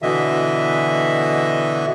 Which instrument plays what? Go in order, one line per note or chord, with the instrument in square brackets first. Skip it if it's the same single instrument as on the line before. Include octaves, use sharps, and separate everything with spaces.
[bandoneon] B2 D3 E3 D#5 E5